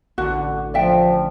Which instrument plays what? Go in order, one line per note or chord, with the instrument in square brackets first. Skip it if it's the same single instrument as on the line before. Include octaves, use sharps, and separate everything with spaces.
[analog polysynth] A1 D3 [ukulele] F#4
[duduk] F3 [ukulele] D5 E5 G5